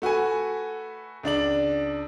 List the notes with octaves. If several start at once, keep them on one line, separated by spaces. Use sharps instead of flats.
A3 F#4 B4 G#5
C#2 D4 D5 F#7